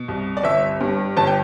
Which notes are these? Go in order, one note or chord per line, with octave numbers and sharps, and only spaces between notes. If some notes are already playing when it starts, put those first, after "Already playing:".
Already playing: B2
C2
D5
G1 E5
G2
G1 A5
G5